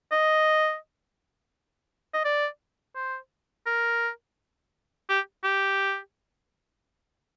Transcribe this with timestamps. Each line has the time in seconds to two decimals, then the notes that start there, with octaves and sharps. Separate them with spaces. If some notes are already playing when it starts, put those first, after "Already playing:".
0.12 D#5
2.14 D#5
2.25 D5
2.95 C5
3.66 A#4
5.09 G4
5.44 G4